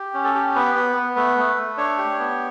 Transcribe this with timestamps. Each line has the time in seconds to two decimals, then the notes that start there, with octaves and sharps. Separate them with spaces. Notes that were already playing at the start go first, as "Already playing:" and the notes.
Already playing: G4
0.14 C#4
0.24 A4
0.35 G4
0.55 B3 B4
0.75 B3
0.96 B3
1.16 A3 B4
1.37 A3
1.57 A3
1.78 D4 C#5
1.98 G4
2.19 B3